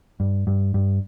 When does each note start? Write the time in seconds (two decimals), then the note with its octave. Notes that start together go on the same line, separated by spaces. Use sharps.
0.20 G2
0.47 G2
0.74 G2